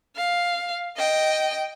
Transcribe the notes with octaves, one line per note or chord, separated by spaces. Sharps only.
F5
D#5 G5